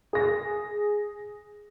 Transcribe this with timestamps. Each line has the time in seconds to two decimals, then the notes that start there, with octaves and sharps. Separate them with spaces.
0.13 G#4 A#6